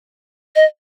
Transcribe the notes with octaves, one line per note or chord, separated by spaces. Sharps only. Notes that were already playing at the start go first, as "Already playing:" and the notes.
D#5